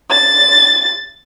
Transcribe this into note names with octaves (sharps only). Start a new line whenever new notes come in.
A6